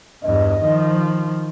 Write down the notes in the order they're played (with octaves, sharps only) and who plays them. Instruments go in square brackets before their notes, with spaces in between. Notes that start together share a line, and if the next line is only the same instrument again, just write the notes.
[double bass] E2 G2 [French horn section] D#5
[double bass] D#3 F3